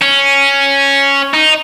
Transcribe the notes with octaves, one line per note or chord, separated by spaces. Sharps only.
C#4
D#4